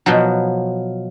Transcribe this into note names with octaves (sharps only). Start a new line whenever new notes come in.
B2 F3 F#3